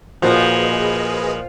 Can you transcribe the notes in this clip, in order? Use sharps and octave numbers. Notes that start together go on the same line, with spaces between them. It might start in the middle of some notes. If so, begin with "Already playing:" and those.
A#2 F3 A#3 F#4 G#4 B4 D#5